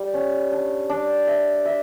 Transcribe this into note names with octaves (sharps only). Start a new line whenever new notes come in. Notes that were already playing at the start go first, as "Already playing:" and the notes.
Already playing: G3
C#4
D4
D4
E5
E5